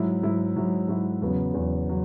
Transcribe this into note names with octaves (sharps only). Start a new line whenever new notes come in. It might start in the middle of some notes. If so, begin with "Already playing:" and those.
Already playing: G#2 F#3 E4
G#2 F#3 E4
G#2 F#3 E4
G#2 F#3 E4
E2 C#3 F#3 B3
E2 C#3 F#3 B3
C#3 F#3